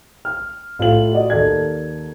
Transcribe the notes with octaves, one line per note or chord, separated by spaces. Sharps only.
F6
A2 F4 A4 E5 F#7
F#4 D5 D#5
D#2 A4 D5 G#6